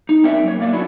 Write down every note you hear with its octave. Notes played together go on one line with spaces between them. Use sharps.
D#4
C4 C#4 A#4 D5 E5
F#2 A#3 C#5
A#3 D5 E5
F#3 C#4 D4 E4 F#4 D5